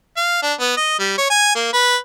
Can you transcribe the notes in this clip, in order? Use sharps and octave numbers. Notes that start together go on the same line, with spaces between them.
F5
D4
B3
D#5
G3
C#5
G#5
A#3
B4